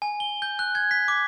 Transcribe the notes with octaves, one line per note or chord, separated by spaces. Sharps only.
G#5
G7
G6
F#6
G#6
B6
D6